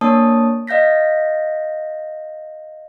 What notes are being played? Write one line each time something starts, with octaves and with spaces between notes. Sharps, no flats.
A#3 D4 C#5 A5 D#6
D#5 F5 G6 A#6 B6